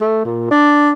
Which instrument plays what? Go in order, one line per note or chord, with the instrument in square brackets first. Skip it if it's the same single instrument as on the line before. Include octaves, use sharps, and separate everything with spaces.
[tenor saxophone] A3
A#2
D4